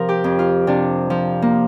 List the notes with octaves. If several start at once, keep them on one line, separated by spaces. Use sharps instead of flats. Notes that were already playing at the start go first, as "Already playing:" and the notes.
Already playing: C3 F3 F4 A#4
G4
F2
F4
C3 D4
F3
A#3